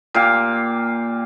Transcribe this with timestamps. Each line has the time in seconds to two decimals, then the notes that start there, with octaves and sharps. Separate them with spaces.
0.14 A#2 G4 F5